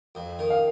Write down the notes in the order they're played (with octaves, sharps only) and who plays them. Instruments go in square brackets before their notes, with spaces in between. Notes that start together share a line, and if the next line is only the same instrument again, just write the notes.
[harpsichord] F2
D#3
[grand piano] F5